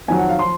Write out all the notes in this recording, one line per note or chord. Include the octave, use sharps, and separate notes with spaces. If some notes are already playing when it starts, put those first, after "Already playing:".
F2 D#3 F#3 G#5
F#5
F5
F3 C6